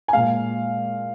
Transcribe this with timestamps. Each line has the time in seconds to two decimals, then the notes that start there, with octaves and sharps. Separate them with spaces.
0.08 G#5
0.13 A#2 G#3 F5